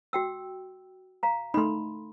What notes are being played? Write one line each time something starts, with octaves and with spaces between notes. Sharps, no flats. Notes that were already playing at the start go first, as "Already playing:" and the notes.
F#4 G5 E6
F5 A#5
A3 D#4 B5 C6